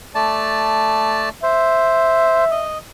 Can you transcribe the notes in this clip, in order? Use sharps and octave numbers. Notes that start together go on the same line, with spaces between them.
A3 D5 A5
C5 E5
D#5